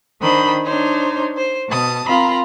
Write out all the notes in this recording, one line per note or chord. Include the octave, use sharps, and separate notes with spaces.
D#3 D4 C5 B5 D#6
D4 D#4 C5 C#5
C5
B2 A5 D#6
C4 F4 A#4 A#5 B5